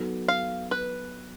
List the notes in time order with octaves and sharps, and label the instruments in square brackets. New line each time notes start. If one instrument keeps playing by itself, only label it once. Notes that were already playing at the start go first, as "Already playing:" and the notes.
Already playing: [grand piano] F#3 B3 D#4 F#4 A4
[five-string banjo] F5
B4